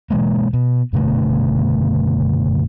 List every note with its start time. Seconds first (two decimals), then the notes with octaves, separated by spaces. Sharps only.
0.10 B2 E3 G#3 A#3
0.53 B2
0.93 F#1 B2 D3 A3